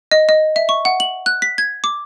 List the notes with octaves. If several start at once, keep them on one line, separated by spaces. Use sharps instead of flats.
D#5
D#5
E5
C#6
F#5
F#7
F#6
B6
G#6
D6